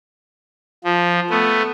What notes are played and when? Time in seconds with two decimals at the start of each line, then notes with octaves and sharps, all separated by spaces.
0.84 F3
1.30 A3 B3